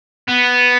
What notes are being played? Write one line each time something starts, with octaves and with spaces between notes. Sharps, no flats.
B3